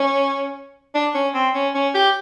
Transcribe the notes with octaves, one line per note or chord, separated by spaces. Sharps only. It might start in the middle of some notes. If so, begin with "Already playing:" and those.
Already playing: C#4
D4
C#4
C4
C#4
C#4
G4